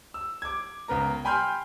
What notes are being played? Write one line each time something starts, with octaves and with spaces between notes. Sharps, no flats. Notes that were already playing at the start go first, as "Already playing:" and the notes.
E6
D6 G#6
C#2 B3 A#4 A#5
G5 G#5 B5 C6 F6 G6